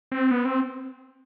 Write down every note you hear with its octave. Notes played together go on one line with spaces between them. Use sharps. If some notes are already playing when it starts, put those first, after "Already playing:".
C4
B3
C4